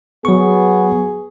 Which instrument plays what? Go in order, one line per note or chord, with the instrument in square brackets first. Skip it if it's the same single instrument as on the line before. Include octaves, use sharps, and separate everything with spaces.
[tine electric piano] F#3 C#6 [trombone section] B3 [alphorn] G#4